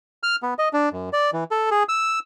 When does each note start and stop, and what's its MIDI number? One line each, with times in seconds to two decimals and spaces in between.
0.23 0.36 89
0.43 0.54 59
0.59 0.69 75
0.73 0.89 62
0.92 1.09 42
1.13 1.30 74
1.33 1.44 52
1.51 1.70 69
1.71 1.83 68
1.89 2.19 88